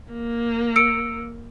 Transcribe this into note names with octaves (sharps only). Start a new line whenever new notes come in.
A#3
E6 C#7 D7